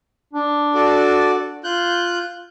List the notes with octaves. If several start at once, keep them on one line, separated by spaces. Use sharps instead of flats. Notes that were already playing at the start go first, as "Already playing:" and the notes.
D4
F#4 A4 D5
F4 F#6 G6